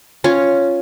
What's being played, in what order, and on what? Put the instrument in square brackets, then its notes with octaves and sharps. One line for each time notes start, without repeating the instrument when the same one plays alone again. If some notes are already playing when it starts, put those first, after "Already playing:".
[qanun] C#4 F4 C#5